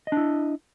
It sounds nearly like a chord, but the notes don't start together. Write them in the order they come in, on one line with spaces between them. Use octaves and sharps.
D#5 D4 E4